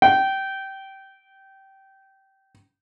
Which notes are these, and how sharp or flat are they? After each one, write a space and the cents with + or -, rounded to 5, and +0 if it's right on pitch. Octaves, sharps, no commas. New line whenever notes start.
G5 -20